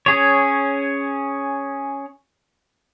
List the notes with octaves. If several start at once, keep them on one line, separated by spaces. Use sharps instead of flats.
C#4 G#4 C#5